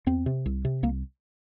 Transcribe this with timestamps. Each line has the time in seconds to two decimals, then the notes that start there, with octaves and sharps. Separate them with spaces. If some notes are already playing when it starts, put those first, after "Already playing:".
0.06 E2 C4
0.26 C3
0.46 C2
0.65 C3
0.83 C2 A#3